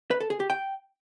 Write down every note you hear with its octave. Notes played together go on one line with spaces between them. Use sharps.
B4
A4
G#4
G4
G5